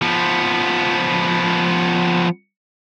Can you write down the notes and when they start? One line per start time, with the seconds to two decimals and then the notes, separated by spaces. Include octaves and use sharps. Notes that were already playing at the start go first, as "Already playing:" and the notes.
0.02 F3 B3